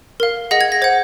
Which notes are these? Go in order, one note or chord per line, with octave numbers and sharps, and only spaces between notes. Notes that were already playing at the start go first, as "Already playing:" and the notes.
A#4 F5
G#4 D#5 F#5 A#6
G#6
A#6
C5 F#5 G#6